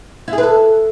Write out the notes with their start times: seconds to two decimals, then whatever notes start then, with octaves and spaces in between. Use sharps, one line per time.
0.28 E4
0.33 G#4
0.38 B4
0.43 A4